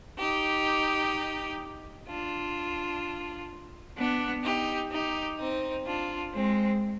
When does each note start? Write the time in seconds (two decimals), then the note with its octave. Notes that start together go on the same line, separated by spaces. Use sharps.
0.19 D#4 G4
2.08 D4 F4
3.97 B3 D4
4.44 D#4 G4
4.92 D#4 G4
5.39 C4 D#4
5.86 D4 F4
6.34 G#3 C4